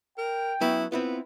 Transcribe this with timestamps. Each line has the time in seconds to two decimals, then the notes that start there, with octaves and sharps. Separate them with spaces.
0.18 A#4 G5
0.61 F#3 B3 C#4 E4
0.92 B3 C4 E4 F4 B4